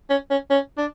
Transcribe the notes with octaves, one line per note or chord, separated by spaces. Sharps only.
C#4
C#4
C#4
D4